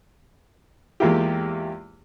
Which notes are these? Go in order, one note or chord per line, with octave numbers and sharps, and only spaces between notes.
E2 G#3 A#3 E4 F4 G4